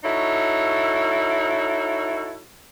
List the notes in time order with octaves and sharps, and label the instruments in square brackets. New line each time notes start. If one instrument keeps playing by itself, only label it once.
[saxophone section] D#4 E4 F#4 A4 C#5